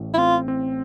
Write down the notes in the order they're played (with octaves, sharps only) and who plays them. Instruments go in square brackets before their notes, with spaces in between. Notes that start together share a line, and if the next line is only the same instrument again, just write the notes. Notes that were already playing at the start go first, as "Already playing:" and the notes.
Already playing: [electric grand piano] A1 A2
[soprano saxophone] E4
[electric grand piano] C4 [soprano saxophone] F4
[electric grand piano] C4